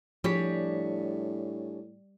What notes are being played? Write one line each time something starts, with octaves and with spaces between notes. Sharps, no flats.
A2 F3 G3 D4 G#4 C#5 B6